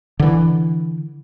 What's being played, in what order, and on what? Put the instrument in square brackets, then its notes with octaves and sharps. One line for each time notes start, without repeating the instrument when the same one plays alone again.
[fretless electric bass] D3 E3